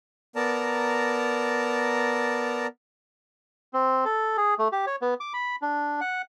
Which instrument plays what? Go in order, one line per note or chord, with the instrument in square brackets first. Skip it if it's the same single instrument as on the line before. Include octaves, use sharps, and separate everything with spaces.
[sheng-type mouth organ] B3 A#4 D5 A5 A#5
[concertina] C4
A4
G#4
A3
G4
C#5
B3
D6
B5
D4
F#5